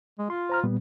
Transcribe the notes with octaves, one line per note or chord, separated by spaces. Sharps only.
G#3
F4 C6
C5 A#5 F6
A#2 G3 B3